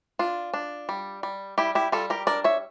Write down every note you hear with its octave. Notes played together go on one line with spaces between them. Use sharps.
D4 F4
D4
G3
G3
G3 E4 G4
E4 G4
G3 F4 A4
G4 A#4
D4 A#4 D5
C#5 E5